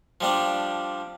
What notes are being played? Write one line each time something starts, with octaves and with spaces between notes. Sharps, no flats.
F3 G3 D4